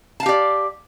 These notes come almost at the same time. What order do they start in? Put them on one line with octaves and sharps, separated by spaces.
A5 F5 G4 D5